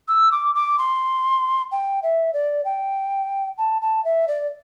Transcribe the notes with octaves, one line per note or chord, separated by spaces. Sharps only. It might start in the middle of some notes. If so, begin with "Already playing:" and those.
E6
D6
D6
C6
G5
E5
D5
G5
A5
A5
E5
D5